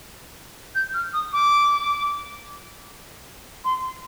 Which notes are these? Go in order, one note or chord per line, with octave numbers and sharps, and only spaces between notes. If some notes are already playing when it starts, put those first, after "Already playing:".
G6
F6
D#6
D6
C6